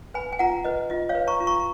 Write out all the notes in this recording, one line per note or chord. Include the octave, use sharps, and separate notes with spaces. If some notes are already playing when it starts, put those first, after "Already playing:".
B4 G#5 B5
G#5
F4 F#5 A#5
B4 D#5
F4 D#5
C#5 F5
B4
A#5 C#6
F4
A#5 C#6